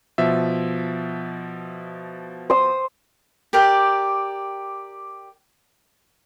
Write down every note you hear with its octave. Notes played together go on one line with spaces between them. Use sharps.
B2 F3 E5
C5 D#6
G4 A#4 D5 G5